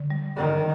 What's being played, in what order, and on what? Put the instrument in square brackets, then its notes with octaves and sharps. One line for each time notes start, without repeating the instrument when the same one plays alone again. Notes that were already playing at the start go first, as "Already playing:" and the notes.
Already playing: [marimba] D3
G3
[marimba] D3 [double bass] D#3